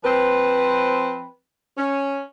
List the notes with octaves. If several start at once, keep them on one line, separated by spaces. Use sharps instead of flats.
F3 C4 B4
C#4